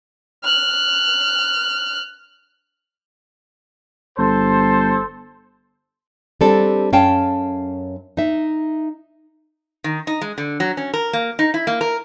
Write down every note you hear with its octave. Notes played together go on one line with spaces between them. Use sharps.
F6 F#6
G1 A4 C5
G3 C4 D4 A4
F#2 C#4 F5 G5 A5
D#4 E5
D#3
D#4
G#3
D3
F#3
C#4
A#4
A#3
D#4
E4
A#3
A#4